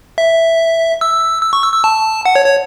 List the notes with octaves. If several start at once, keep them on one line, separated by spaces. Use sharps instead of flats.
E5
E6
E6
C#6
E6
E6
A5
F#5
C#5
C#5